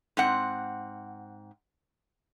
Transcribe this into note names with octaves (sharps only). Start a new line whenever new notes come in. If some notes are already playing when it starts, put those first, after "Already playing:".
G#2 C4 F#5